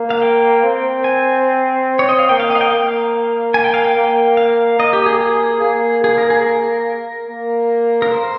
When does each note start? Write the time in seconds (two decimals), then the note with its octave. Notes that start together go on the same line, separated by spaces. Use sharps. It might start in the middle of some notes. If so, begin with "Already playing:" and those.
Already playing: A#3
0.10 F5
0.22 G5
0.64 C4
1.04 G#5
1.99 C#5
2.09 D#5
2.19 F5
2.29 A#3 G5
2.40 F5
2.50 D#5
2.55 F5
2.61 G5
2.70 A#3 F5
3.54 G#5
3.64 G5
3.74 F5
3.85 G5
3.96 A#3
4.37 F5
4.79 A#3 D#5
4.93 G4
5.06 G#4
5.21 G#4
5.62 A#3 G#4
6.04 G#4
6.18 A#4
6.30 G#4
6.46 A#4
7.28 A#3
8.02 A#4
8.12 C5